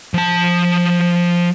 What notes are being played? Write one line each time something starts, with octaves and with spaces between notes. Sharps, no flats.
F3 A5